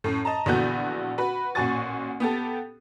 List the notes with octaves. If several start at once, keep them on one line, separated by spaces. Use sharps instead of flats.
F#2 A2
D#5 A5 A#5
A#1 D3 E3 B3 F#4 G6
F#4 B4
A1 A#2 F#4 G#5 C#6 A6
B3 G4 A4